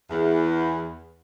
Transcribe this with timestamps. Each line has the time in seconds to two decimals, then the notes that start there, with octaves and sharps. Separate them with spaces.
0.10 E2